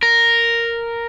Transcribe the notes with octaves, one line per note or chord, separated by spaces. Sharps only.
A#4